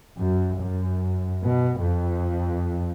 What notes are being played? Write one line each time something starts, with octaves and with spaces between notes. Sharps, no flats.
F#2
F#2
B2
F2